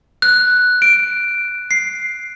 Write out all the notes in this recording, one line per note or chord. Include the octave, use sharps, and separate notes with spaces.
F#6
D7
C7